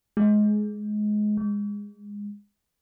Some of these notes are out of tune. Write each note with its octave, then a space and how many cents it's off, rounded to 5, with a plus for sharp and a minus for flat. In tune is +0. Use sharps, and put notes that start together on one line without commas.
G#3 +20
G#3 -20